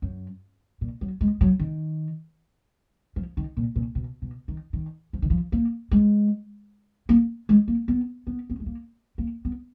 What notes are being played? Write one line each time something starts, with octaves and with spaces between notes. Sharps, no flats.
F#2
A#2
F#3
G#3
F#3
D#3
F3
D#3
A#2
A#2
B2
B2
D#3
D#3
F3
D#3
F3
A#3
G#3
A#3
G#3
A#3
B3
B3
B3
G#3
A#3
A#3
B3